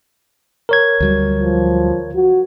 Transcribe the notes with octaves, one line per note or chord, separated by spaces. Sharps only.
A#4 C#5 G#6
D2 F#3 G3
F3
F#4